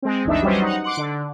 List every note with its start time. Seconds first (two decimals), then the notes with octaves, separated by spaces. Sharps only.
0.02 G#3 C4
0.25 G1 D2 E3 D4 D#4 E5
0.42 F#3 G3 C#4 B4 C5 D#5
0.62 D#4 F#5
0.84 F#5 C6 D6 F#6
0.97 D3